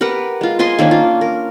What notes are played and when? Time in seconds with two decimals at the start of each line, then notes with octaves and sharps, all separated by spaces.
0.01 G4 A#4 B4 F#5
0.41 G#3 F4
0.59 F4 D#5 G#5 C6
0.78 D#3 A#3 C#4 D4
0.91 F4
1.21 A#4